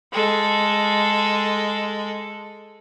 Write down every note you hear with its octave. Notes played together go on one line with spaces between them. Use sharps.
G#3 A4